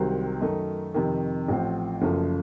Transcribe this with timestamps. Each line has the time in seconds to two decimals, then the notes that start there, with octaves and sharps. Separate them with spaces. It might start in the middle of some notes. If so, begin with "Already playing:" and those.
Already playing: C2 C3 D#3 F#3 C4
0.41 F#2 D#3 A3 D#4
0.94 F2 C3 D#3
1.48 A1 A2 F3 C4
2.02 F#1 F#2 C#3 F3 A3